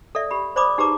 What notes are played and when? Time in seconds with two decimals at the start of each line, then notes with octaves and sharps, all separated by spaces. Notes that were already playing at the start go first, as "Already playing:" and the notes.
0.15 A4 D5 E5
0.31 G4 B5
0.56 C5 D5 B5 D6 D#6
0.78 D#4 G4 G#4 B4 A#5 D6